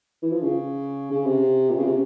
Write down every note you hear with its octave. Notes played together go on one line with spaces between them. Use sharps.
E3
F3
C#3
C#3
C3
A#2
C#3
C3